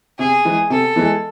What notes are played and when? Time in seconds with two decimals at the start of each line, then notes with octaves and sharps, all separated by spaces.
0.18 C3 G#4
0.45 E3 G#3
0.70 C3 A4
0.96 E3 G#3